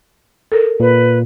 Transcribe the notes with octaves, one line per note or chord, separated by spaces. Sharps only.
A4 A#4
A#2 B4